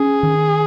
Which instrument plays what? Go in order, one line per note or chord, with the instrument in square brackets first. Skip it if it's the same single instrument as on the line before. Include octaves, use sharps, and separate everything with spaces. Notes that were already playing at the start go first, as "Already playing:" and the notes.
Already playing: [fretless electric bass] C#4 [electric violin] G#4
[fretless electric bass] D#3